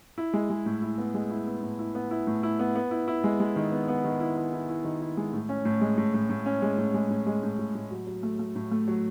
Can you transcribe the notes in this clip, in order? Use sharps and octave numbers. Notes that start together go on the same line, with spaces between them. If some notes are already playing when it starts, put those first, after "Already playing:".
E4
G#3
G#3
A2
E4
B3
G#3
E4
B3
A2
E4
B3
E4
A2
E4
B3
B3
E4
E4
G#3
G#3
D#3
B3
B3
D#3
E4
E4
E4
E4
D#3
E4
G#3
A2
C#4
A2
G#3
A2
A2
A2
C#4
G#3
A2
G#3
A2
G#3
A2
A2
A2
F#3
F#3
A3
A3
A2
A3
F#3